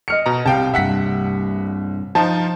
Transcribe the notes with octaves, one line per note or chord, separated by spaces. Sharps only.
D#5 F6 C#7
B2 A#5
C2 F5 G5 A5
G2 C3 E5 F#5 B6
F3 D#4 F4 A5